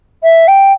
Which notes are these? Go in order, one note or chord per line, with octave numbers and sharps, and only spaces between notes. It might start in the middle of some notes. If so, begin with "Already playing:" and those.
E5
G5